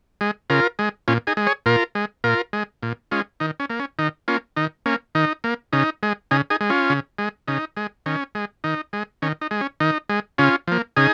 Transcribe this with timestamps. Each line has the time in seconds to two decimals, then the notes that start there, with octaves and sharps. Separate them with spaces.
0.21 G#3
0.50 C#3 F4 A#4
0.79 G#3
1.08 A#2 C#4 F4
1.27 D#4 G#4
1.37 G#3
1.47 G#4 C#5
1.66 A#2 F4 A#4
1.95 G#3
2.24 A#2 F4 A#4
2.53 G#3
2.83 A#2
3.11 G#3 C#4 F4
3.40 D#3 D#4
3.60 C#4
3.70 A#3
3.80 C#4
3.99 D#3 D#4
4.28 A#3 C#4 F4
4.56 D#3 D#4
4.86 A#3 C#4
5.15 D#3 D#4
5.44 A#3
5.73 C#3 D#4
6.03 G#3
6.31 C#3 D#4 G#4
6.50 D#4 G#4
6.61 G#3
6.70 C#4 F4
6.90 C#3
7.19 G#3
7.48 C#3 D#4
7.77 G#3
8.06 D#3 C#4
8.35 G#3
8.64 D#3 D#4
8.93 G#3
9.22 D#3 C#4
9.42 D#4
9.51 G#3
9.61 C#4
9.80 D#3 D#4
10.10 G#3
10.38 C#3 C#4 F4
10.68 F3 A#3
10.97 C#3 D#4 G#4